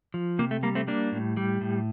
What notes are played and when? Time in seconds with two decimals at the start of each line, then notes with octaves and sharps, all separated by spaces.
0.14 F3
0.39 C3 A#3
0.51 A3
0.63 G3 A#3
0.75 A3 C4
0.87 G3 A#3 D4
1.12 A2
1.37 G3
1.61 A2